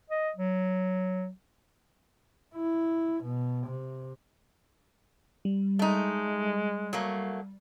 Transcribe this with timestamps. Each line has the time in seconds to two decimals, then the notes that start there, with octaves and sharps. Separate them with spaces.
0.10 D#5
0.37 F#3
2.55 E4
3.24 B2
3.67 C3
5.45 G3
5.79 G#3 A3 D#4
6.93 F#3 A3 A#3